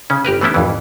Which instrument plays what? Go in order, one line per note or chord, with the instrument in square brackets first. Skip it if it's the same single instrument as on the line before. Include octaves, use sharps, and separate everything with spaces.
[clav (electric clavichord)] C#3 C#4
G1 G4 A#4 B4
E3 A3 B3 C#4 E4
G#1 F2 E3